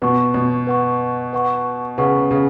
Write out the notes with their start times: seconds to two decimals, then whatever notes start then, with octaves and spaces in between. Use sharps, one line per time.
0.02 B2 B4 F#5 C#6
0.34 B2
0.67 B4 F#5 C#6
1.33 B4 F#5 C#6
1.98 C#3 B4 F#5 C#6
2.31 C#3